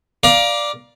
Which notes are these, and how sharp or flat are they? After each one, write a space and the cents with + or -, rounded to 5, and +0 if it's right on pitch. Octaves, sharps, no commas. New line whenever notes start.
D5 +0 F5 +0 A#5 +30